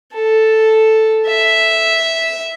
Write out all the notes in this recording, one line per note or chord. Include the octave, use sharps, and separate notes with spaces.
A4
E5